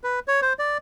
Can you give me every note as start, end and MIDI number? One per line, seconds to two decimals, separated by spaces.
0.04 0.20 71
0.28 0.40 73
0.42 0.53 72
0.59 0.78 74